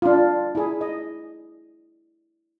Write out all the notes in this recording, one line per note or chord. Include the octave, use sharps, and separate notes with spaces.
D4 F4
E4 G#4
D#5